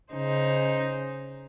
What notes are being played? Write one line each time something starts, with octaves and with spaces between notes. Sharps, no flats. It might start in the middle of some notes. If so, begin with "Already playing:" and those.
C#3 D#4 C5